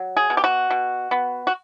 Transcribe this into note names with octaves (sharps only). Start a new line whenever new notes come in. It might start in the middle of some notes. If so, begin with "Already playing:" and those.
Already playing: F#3
G#4
B2
G4
F#4
B2
B3
F#4